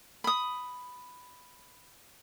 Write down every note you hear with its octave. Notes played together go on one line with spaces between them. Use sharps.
B5 D#6